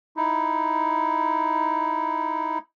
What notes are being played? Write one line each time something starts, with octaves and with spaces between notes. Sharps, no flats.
D#4 E4